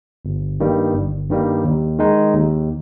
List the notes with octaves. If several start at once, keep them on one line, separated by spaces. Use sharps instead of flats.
G1
G2 D#3 G3 A#3
G1
G2 D#3 G3 A#3
D#2
D#3 G#3 D#4
D#2